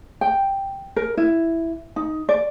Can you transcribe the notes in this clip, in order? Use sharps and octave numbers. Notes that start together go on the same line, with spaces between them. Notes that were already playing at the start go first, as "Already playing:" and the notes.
G5
A#4
E4
D#4
D5